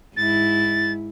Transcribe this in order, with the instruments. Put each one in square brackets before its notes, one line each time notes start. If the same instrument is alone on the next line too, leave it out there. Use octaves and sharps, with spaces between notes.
[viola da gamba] G#2 E4 [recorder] A6